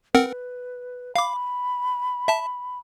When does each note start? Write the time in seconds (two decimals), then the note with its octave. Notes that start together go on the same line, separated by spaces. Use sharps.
0.15 C4 A#4 B4 F#5
1.16 F5 B5 D6
2.28 E5 A5